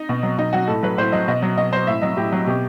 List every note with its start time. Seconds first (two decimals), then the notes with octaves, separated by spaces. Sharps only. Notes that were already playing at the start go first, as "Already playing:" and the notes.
Already playing: D#4
0.09 B2
0.23 F#3
0.38 B2 D#4
0.53 F#3 F#4
0.68 A2 A4
0.83 F#3 B4
0.98 A2 C5
1.12 F#3 D#5
1.28 B2 D#5
1.42 F#3
1.57 B2 D#5
1.72 F#3 C5
1.87 A2 E5
2.02 F#3 D#5
2.17 A2 G4
2.32 F#3
2.47 B2 G4